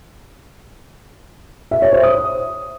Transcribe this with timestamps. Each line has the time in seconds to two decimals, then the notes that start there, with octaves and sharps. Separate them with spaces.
1.71 E5
1.82 C#5
1.93 C5
2.03 D#6